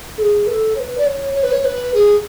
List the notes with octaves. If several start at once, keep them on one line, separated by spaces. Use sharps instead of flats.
A4
G#4
B4
A4
C#5
B4
D5
C#5
C#5
B4
C#5
B4
G#4